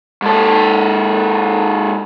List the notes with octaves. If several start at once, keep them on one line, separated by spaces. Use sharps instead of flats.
G#2 A4